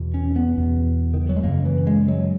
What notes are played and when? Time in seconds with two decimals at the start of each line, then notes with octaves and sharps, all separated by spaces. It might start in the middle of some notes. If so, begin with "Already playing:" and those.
Already playing: E2 B2
0.14 C#4
0.36 B3
0.57 E2 B2
1.14 D#3
1.21 E3
1.29 F#3
1.36 G#3
1.43 F#2 C#3 A#3
1.65 E3
1.87 G#3
2.08 F#3